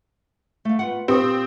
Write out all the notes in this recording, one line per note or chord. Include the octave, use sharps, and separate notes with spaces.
A3 F5
B3 F4 F#5
A#2 C4 G4 D#6